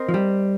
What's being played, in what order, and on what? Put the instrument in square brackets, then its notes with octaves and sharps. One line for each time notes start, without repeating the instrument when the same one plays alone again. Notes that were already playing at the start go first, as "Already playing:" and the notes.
Already playing: [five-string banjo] C4 A#4 D#5
[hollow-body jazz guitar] F3
G3